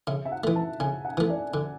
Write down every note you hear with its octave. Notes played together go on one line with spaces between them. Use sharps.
C#3 E5
E5
F#5
E3 A3
A5
C#3 G#5
F#5
E3 A3
D5
D3